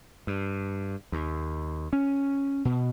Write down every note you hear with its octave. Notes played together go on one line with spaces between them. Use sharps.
G2
D#2
C#4
B2